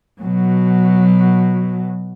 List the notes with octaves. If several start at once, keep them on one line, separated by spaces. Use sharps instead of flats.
B2 F#3